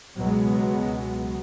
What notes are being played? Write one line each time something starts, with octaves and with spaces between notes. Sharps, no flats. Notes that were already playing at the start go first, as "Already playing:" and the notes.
C#2 B2 F#3 G#3 B3